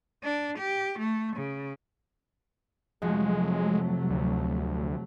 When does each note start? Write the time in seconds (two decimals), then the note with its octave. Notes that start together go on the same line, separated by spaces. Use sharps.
0.23 D4
0.58 G4
0.99 A3
1.36 C#3
3.02 F1 C3 F3 F#3 G#3 A3 F#4
4.10 D2